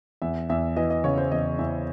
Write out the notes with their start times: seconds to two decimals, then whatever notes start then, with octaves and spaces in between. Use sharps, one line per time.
0.22 E2 E5
0.50 E2 E5
0.77 E3 D#5
0.90 D#5
1.04 C#3 C#5
1.18 C5
1.31 E2 D#5
1.59 E2 E5